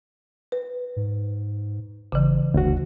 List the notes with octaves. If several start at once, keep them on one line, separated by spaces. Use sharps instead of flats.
B4
G#2
G#1 C#3 E3
F#1 D2 F#4